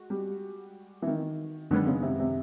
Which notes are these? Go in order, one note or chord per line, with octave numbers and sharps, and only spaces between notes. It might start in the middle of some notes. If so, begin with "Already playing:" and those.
Already playing: G#3 F#4
G3
E3
D#3
F#2 D3 D#3 G#3 B3
C#3
C3
C3